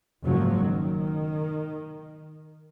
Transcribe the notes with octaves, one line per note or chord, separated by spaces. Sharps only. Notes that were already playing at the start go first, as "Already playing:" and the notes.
F#1 G#2 F3 F#3
D#3